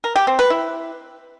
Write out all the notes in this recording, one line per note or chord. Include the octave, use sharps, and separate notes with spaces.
A#4
G4
C4
B4
E4